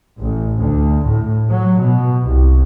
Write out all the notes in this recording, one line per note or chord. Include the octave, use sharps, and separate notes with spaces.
A1
D2
A2
F#3
B2
C2